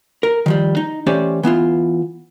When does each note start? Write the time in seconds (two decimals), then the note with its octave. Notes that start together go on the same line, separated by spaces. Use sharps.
0.23 A#4
0.46 D#3 F3 G3
0.77 D#4
1.06 E3 A3 C#4 G4 C5 D5
1.43 E3 B3 E4 F4